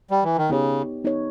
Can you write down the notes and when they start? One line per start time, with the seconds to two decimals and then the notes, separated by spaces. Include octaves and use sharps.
0.11 G3
0.24 E3
0.37 D#3
0.50 C#3 B3 D#4 G4 C#5
1.04 B3 D#4 G4 C#5